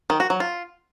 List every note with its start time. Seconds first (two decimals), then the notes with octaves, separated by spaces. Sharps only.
0.10 D#3
0.20 F#4
0.30 F#3
0.40 F4